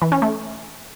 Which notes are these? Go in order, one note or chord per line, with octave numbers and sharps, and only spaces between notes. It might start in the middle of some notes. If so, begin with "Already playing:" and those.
E3
C#4
A3